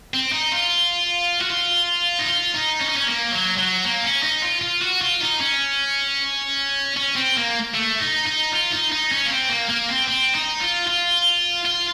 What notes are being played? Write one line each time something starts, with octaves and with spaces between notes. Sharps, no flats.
C4
D#4
F4
F#4
F4
D#4
F4
D#4
C#4
D#4
C#4
A#3
F#3
F#3
A#3
C#4
D#4
F4
F4
F#4
F4
D#4
C#4
C#4
C4
A#3
A3
D#4
D#4
F4
D#4
D#4
C#4
A#3
C4
A#3
A#3
C4
C4
D#4
F4
F4
F4